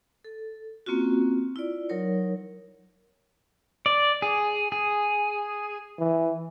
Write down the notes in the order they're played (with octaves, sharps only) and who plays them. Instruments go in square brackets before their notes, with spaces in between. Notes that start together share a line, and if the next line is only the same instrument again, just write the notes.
[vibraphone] A4
A#3 C4 C#4 F4 F#4
E4 F4 D5
F#3 D#4 A#4 C#5
[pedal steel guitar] D5
G#4
G#4
[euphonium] E3